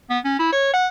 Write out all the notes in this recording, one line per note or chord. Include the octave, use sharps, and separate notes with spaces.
B3
C#4
E4
C#5
F#5